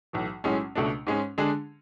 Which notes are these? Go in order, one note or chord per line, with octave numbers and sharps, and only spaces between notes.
B1 A2 E3
B1 A2 G#3 C#4
C#2 B2 A3 D4
G#2 G#3 C#4
D3 G#3 D4 G#4